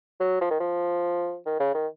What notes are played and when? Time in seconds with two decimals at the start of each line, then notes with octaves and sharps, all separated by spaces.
0.20 F#3
0.41 F3
0.51 D#3
0.60 F3
1.46 D#3
1.60 C#3
1.74 D#3